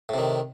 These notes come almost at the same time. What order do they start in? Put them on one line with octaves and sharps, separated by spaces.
A2 C3 D#3